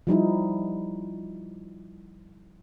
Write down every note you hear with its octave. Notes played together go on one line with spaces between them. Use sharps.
F3 G3 D#4 E4